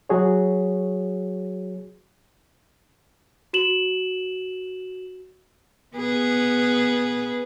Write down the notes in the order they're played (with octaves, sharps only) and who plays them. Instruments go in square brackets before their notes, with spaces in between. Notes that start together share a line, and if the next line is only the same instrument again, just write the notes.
[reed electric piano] F#3 F#4 G#4 C#5
[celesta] F#4 E7 F#7
[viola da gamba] B3 G#4 B4